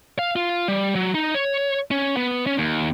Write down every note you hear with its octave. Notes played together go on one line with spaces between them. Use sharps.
F5
F4
G3
F#3
D#4
C#5
C#4
B3
C#4
D#2